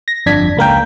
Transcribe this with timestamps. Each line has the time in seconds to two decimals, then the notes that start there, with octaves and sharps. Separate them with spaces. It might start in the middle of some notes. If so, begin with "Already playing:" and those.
0.08 A#6
0.26 G1 F2 D4 G#6 B6
0.57 C#2 A#3 A#4 G5